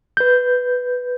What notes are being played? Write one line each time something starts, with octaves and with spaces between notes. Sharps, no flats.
B4 G6